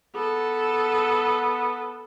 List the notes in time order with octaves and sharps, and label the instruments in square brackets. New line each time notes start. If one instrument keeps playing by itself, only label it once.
[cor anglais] B3 [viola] A4